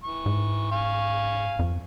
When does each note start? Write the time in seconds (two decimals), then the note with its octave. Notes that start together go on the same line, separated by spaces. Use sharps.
0.04 E3 C#6
0.26 G#2
0.72 F5 G#5 C#6
1.59 F2